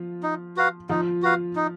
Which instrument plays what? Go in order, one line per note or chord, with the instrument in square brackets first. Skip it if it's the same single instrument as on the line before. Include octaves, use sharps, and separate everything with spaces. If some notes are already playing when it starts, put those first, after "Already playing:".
Already playing: [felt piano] F3 F4
[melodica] D#4
F#4 B4 F5
[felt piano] F3 F4 [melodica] D#4
[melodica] F#4 B4 F5
D#4